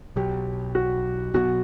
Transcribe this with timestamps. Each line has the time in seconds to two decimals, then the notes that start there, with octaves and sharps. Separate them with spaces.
0.16 B1 B2 F#3 G4
0.75 F#4
1.34 B1 B2 F#3 B3 F#4